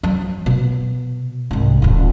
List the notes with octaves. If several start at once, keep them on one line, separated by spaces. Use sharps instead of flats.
F3 F#3
B2
C2 G#2
D#1 A2